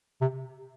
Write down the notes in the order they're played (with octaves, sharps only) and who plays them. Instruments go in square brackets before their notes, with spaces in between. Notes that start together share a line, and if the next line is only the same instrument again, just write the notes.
[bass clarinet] C3